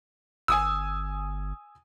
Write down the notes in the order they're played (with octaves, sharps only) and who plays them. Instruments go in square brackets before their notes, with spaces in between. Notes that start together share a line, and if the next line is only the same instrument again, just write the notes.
[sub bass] G1 [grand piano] G#5 D#6 E6